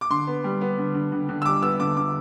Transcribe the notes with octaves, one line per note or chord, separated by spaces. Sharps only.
D6
D3 C6
B3
G3
B3
D3
D3
D3
D3
E6
G3 D6
B3 E6
D3 D6
D3 D6